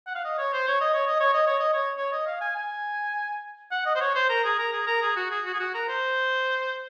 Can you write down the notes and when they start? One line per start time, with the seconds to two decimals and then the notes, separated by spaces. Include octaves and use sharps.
0.07 F#5
0.15 F5
0.24 D#5
0.38 C#5
0.53 C5
0.68 C#5
0.81 D#5
0.94 C#5
1.07 D#5
1.20 C#5
1.33 D#5
1.47 C#5
1.59 D#5
1.73 C#5
1.97 C#5
2.12 D#5
2.27 F5
2.41 G#5
2.56 G#5
3.72 F#5
3.86 D#5
3.95 C5
4.01 C#5
4.15 C5
4.29 A#4
4.44 G#4
4.59 A#4
4.73 G#4
4.87 A#4
5.02 G#4
5.16 F#4
5.31 G#4
5.46 F#4
5.54 G#4
5.59 F#4
5.74 A#4
5.89 C5